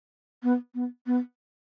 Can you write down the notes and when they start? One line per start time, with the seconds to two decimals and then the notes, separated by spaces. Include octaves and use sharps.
0.43 B3
0.74 B3
1.06 B3